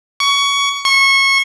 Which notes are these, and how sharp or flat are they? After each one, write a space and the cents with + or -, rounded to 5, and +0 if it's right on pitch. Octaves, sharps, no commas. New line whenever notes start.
C#6 +20
C#6 -25